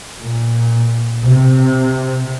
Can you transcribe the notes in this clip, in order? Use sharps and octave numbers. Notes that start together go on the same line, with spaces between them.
A#2
C3